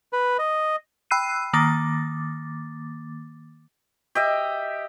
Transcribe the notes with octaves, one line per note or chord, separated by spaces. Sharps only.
B4
D#5
G5 B5 E6 F#6 C7 D#7
D#3 A#3 D6 A6
G4 D#5 E5